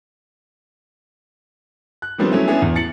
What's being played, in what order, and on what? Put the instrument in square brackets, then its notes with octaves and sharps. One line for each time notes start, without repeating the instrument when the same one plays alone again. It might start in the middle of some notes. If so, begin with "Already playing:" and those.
[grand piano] F#6
D#3 F3 G3 B3 C4 D4
F#3 A3 C#4 E4
B3 C#4 D4 E4 G#4
E2
A6 C#7 F#7